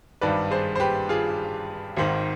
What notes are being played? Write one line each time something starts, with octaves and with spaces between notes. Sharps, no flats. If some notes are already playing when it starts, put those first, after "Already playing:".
G#1 G2 D#3 B4 D5
G#4 C5
C5
G4 B4
F4 G#4
G#1 G#2 D#3